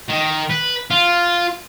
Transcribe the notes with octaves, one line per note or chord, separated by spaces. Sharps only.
D#3
B4
F4